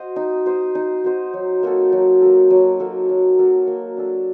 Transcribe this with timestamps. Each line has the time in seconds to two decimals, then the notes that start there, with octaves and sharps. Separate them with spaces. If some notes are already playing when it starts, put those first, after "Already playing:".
Already playing: F#4 C5 D#5
0.16 D#4
0.46 F#4 C5 D#5
0.75 D#4
1.04 F#4 C5 D#5
1.33 F#3
1.63 A#3 F#4 A4
1.92 F#3
2.22 A#3 F#4 A4
2.50 F#3
2.79 A#3 F#4 A4
3.09 F#3
3.38 A#3 F#4 A4
3.67 A#3
3.97 D4 A4